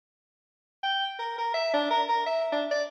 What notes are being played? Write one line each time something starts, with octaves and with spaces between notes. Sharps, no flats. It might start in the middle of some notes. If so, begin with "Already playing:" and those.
G5
A#4
A#4
E5
D4
A#4
A#4
E5
D4
D5